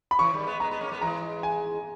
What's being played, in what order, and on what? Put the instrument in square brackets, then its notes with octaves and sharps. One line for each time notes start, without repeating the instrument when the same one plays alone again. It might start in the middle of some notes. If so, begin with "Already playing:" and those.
[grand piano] B5
[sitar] C#3 E3 [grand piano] C#6
[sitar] D#3 G3
G#3 B3
[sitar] G#3 B3 [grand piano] A#5
[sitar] G#3 B3
A#3 C#4
G#3 B3
[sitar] E3 G#3 [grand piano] A#5
[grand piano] G#5